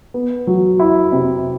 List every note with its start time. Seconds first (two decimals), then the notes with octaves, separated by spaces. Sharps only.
0.14 B3
0.47 F#3
0.80 E4
1.12 C3